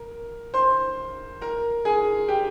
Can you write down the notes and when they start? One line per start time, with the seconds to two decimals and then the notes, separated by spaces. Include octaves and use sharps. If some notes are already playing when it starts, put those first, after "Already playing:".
Already playing: A#4
0.54 C5 C6
1.42 A#4 A#5
1.85 G#4 G#5
2.28 G4 G5